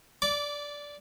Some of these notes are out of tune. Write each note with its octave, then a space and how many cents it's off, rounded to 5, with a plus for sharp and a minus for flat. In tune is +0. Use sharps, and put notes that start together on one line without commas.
D5 -10 D6 -25